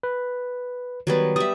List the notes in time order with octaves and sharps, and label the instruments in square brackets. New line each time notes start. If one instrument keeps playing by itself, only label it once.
[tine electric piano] B4
[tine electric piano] D#3 [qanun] F#3 G3 B3
[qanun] G3 E5 [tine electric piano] D#6